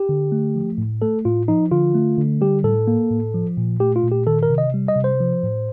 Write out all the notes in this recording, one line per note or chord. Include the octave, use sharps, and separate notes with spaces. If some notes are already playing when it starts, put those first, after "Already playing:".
Already playing: G4
D3
A3
F3
A2
A3 A4
A2 F4
F3 D#4
D3 F4
A3
D3
G3 G4
A2 A4
A#3
A2
F3
A#2
A3 G4
F4
A#2
G4
D#3 A4
A#4
C3
D#5
G3
D#5
C3
C5
F3
A2